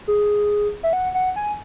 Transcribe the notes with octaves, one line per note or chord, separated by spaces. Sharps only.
G#4
E5
F#5
F#5
G#5